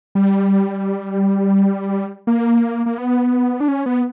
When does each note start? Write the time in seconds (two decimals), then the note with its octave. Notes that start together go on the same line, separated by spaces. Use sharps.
0.15 G3
2.27 A#3
2.86 A#3
2.98 B3
3.60 D4
3.68 C#4
3.86 B3